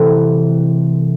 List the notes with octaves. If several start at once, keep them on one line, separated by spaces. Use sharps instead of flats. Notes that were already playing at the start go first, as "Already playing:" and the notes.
Already playing: C3 E3 A3 C4